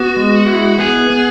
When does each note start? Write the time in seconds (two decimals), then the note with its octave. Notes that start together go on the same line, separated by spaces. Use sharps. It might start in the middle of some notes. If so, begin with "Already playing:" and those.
Already playing: B3 F#4
0.16 G#3
0.47 E4
0.79 B3 G#4
1.10 B3